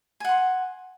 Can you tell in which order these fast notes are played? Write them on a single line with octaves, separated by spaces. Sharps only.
G#5 F#5 C6